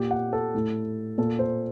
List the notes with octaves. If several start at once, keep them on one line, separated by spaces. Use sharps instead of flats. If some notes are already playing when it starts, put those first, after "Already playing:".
Already playing: A#2 G4
F#5
A4
A2
A#2 A4
C5